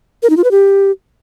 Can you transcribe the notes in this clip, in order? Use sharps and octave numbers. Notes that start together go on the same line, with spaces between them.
A#4
D#4
F4
B4
G4